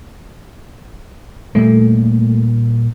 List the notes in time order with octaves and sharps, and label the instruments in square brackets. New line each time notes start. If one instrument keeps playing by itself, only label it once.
[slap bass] A#2 G3 A#3 [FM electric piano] A3